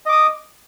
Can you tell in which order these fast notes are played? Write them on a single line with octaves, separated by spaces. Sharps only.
D#5 D6 D#6